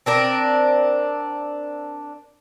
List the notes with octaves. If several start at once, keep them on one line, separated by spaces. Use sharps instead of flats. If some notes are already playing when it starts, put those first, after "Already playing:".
C4 D4 A#4